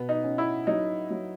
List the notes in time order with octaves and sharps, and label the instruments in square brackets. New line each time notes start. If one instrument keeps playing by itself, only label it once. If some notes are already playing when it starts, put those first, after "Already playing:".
Already playing: [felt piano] B2 [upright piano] B3
[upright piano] D#4
[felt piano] C#4
[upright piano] E4
[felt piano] F#3 [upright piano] D#4
[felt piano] F#3